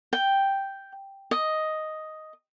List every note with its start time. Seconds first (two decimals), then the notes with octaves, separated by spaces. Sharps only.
0.13 G5
1.31 D#5